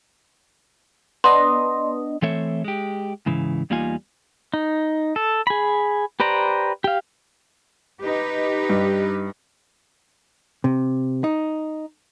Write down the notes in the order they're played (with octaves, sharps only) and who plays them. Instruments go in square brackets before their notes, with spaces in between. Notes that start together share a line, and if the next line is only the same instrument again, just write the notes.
[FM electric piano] B3 D4 D#5 [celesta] C6
[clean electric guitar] E3 A3 C4 A4 C#5 E5
G#3 G4
G#2 C#3 E3
E2 G3 A#3 D#4 F4 G#5
[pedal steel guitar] D#4
A4
G#4 B5
G4 B4 C5 D5 A#5
G4 F5
[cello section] D#4 G4 B4
[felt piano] G2
[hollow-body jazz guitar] C3
D#4